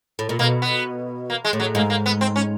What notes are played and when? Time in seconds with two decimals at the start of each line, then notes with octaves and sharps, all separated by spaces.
0.19 A2
0.29 A#2
0.39 B2 A#3
0.62 B3
1.30 A#3
1.44 G#3
1.53 A2
1.60 F#3
1.75 G#2 A#3
1.90 A#3
2.06 B3
2.21 C4
2.36 C#4